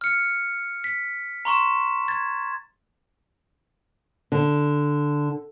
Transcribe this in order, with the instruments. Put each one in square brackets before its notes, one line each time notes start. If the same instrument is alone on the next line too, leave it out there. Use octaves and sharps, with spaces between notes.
[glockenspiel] F6 C#7
B6
A#5 C6 C#6 E7
G#6 A6
[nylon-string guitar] D3